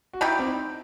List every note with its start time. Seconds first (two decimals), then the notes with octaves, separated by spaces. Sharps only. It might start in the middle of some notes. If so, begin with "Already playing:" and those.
0.13 F#4
0.21 B2 G3 D#4 E4 G4
0.39 C4
0.47 D#4